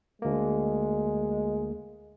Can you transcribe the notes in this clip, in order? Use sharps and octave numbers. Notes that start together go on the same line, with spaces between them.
D2 G#3 A#3